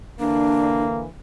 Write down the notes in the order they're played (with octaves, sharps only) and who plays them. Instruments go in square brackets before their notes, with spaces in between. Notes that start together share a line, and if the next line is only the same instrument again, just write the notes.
[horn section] D3 E3 A#3 [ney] D4